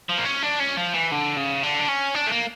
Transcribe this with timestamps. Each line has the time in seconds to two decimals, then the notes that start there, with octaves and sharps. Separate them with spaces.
0.09 F3
0.18 A#3
0.25 C#4
0.43 D4
0.60 C#4
0.77 F3
0.94 E3
1.12 D3
1.37 C#3
1.63 D3
1.80 D4
1.89 C#4
2.15 D4
2.27 A3
2.32 A#3